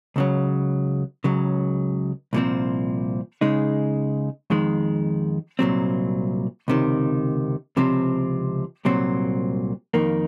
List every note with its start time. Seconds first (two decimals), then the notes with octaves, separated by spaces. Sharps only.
0.16 C#2 C#3 F#3
1.24 C#2 C#3 F#3
2.33 C2 A#2 F3 C4
3.41 C#3 G#3 D#4
4.50 F2 D#3 G#3
5.59 C2 A#2 F#3 C4
6.68 C#2 C3 D#3
7.77 C#2 C3 F3 C4
8.85 C2 A#2 F#3 C4
9.94 F2 D#3 A#3